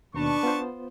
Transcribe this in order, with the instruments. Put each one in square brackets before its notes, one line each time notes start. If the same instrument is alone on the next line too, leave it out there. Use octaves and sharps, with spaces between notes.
[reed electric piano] D#2 B2 [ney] D4 [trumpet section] B4 A5 C#6
[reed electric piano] B3 F4 C5